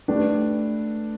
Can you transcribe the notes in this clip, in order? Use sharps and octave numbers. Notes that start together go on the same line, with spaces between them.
A3 D4 G4 B4